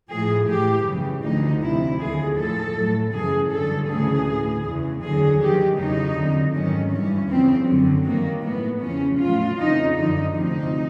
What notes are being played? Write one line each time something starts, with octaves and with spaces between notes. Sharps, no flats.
A2 F3 G#4
A2 E3 G4
F#2 C#3 E3
D2 D3 F3 D#4
D2 C3 F3 E4
D#2 D3 F#3 G#4
A2 F3 A4
A2 F#3
F#2 C#3 E3 G#4
G2 D3 F#3 A4
D2 C#3 E3 G#4
A2 E3
E2 C#3 E3
D#2 D3 F#3 G#4
G2 D#3 F#3 G4
E2 C#3 F#3 D#4
F2 D3 F#3
G#2 D#3 F#3 C#4
G2 E3 C#4
E2 C#3 F3 C4
F#2 D3 F#3
G2 D#3 F#3 A#3
A2 E3 B3
E2 C#3 F3 C#4
A2 F#3 F4
F2 C#3 E3 D#4
F#2 D3 F3 D#4
D2 C3 F3 D#4